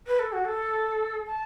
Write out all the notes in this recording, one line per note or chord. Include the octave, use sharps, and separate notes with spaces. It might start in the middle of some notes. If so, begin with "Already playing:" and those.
B4
A4
F#4
A4
A5